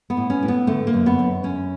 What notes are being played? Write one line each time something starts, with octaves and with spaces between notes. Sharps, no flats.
B3
A2
C#4
A2
B3
D3 A3
A#3
F#2
B3
F#2
F#2 C#4